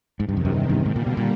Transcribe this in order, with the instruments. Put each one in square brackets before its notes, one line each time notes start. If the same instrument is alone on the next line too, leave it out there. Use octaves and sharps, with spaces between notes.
[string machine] E2 C3 D#3 [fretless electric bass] G#2
[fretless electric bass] G2
F2
F#2
G2
G2
[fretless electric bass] G#2 [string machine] D3 G3 A#3
[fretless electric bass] A#2
B2
A#2